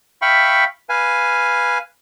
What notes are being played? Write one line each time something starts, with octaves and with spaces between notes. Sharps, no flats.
E5 F5 G5 B5 C#6
B4 F5 G#5